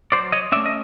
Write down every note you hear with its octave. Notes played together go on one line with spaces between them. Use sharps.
F#3 C5 D5
C#5 D#5
A3 C#4 D5 E5
D#5